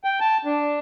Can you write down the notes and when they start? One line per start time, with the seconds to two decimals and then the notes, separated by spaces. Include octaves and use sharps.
0.04 G5
0.20 A5
0.45 D4